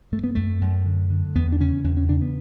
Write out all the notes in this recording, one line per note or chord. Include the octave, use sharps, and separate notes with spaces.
G2 A3
B3
F#2 A3
F#2
D3
D3
E2 B3
D4
C#3 C#4
E2 C#4
C#4
C#3 D4
B3